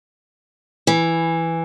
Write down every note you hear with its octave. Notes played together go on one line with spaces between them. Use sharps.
E3